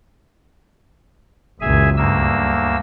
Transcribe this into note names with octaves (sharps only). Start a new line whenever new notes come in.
F#1 C#2 A#2 G#4 E5 G#5
D2 G2 A#3 E6